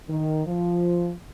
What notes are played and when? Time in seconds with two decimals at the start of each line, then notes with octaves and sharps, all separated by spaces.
0.09 D#3
0.46 F3